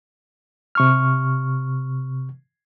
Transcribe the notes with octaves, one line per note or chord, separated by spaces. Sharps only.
C3 C#6 F6